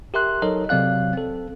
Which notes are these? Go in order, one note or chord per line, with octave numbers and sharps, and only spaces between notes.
G4 A#4 E5 C6 F#6
F#3 D#4 A4 A#4 C#5 D#5
C3 F#3 C4 D5 F5 F#6
C4 A4